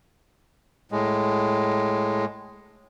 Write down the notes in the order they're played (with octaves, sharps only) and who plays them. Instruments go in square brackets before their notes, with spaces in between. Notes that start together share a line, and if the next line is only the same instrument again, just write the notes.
[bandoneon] A2 G#3